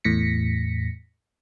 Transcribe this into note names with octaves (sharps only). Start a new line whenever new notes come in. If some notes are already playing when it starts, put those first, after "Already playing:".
E2 A2 A#6 B6 C#7